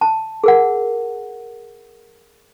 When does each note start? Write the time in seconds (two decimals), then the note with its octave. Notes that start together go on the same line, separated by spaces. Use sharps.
0.01 A5
0.44 G#4 A#4 F#5